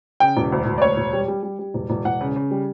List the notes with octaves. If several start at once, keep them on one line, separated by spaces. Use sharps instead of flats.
C#3 G5
E1
D2
E1
D5
D2 C#5
E1
G3
G3
G3
G3
E1
E1
E1 F#5
C#3
C#3
G3